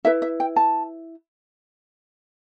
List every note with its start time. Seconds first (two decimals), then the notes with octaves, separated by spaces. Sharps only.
0.05 E4 B4 E5
0.22 E5
0.40 G5
0.56 A5